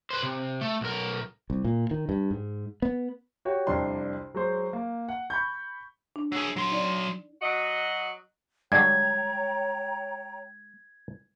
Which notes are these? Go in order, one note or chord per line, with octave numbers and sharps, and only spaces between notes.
B4 C5
C3
A3
B1 A#4
C2
A#2
D#3
G2
G#2
B3
F#4 G4 C#5 G5
C2 F2 D4 C6
F#3 G#3 C5
A#3
F#5
B5 C#6 G6
D4
F#3 G#4 E6
F#3 C6
D#4 D5
F#3 F#4 D#5
G2 D3 F#3 G#3 C#5 G5 A#5 G#6